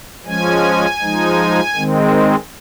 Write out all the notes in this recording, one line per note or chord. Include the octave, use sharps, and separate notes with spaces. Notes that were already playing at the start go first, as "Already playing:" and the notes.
F3 G#3 C#4 G#5
F3 G#3 D#4
D#3 G#3 C4